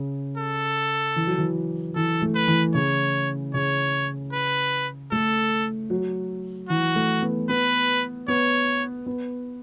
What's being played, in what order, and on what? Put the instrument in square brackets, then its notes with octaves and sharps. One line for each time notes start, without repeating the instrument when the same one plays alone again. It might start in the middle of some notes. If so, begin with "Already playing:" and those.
Already playing: [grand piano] C#3
[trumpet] A4
[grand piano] E3
F#3
E3
[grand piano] E3 [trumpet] A4
[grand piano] A3
[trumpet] B4
[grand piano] E3
[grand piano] C#3 [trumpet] C#5
[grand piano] C#3 [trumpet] C#5
[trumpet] B4
[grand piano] A3 [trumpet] A4
[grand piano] F#3
[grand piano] E3 [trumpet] F#4
[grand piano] A3
B3
[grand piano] B3 [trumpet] B4
[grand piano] B3 [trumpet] C#5
[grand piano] B3